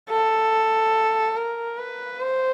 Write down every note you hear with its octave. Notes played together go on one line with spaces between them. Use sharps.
A4
A#4
B4
C5